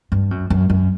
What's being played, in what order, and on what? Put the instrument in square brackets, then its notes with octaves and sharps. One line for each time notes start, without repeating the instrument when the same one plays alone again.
[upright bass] G2
F#2
F#2
F#2